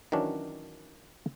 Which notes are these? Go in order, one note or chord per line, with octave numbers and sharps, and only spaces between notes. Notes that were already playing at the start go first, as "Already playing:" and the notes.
D#3 E3 F#3 C#4 D4